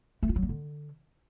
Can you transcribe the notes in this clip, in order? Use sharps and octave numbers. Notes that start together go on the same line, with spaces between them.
A3
F4
F#3
A#3
D3